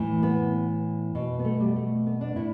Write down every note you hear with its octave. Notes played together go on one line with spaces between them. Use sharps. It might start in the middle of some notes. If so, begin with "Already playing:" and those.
Already playing: A2 E3
B3
B2
B3
A3
G3
A3
B3
D4
A2 E4